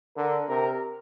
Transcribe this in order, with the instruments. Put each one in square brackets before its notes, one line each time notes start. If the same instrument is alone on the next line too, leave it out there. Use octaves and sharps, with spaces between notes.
[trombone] D3 [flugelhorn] A#4
[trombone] C3 [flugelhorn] A#4